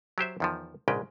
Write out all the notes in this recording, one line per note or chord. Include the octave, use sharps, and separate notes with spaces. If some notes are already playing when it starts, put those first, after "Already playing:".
F#3 G4 C5 E5
E2 D#3 F3
A#1 G#2 C#3 G#3 B4 G5